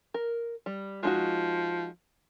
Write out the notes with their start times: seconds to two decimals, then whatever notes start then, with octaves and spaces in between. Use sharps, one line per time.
0.14 A#4
0.66 G3
1.03 F3 G#3 D#4 F#4